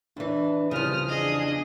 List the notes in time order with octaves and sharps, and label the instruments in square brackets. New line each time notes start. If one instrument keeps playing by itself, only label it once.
[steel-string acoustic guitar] E2 E3 [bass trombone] D4
[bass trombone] C2 [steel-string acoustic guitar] C#3 F3 [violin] D#6 F6
[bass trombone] E2 [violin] D4 G#4 [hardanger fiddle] D#5